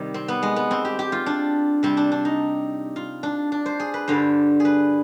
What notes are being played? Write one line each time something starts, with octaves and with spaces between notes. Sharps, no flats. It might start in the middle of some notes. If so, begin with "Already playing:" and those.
Already playing: C3 D#3 G3
C4
B3
G#3
B3
C4
G4
G4
F4
D4
C3 G3 C4
D4
D4
D#4
F4
D4
D4
C5
G#4
B4
G2 D3 G3 C5
G#4
B4